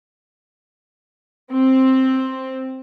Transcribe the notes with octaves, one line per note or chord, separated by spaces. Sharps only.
C4